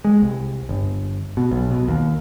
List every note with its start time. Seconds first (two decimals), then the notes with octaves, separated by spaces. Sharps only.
0.05 G#3
0.22 C2
0.69 G1
1.37 B2
1.51 B1
1.71 B2
1.88 D#2